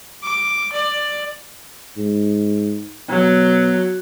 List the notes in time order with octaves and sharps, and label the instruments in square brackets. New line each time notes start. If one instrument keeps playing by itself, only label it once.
[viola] D6
D5
[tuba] G#2
[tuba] B2 [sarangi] F#3